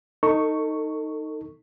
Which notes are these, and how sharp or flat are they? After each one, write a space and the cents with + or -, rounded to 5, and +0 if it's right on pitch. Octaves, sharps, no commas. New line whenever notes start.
D#4 +0 A4 +35 C#6 +0